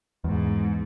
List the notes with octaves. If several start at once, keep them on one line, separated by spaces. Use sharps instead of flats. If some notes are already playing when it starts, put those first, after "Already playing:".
E2 G#2